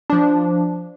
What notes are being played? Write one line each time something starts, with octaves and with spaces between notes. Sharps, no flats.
F3 D4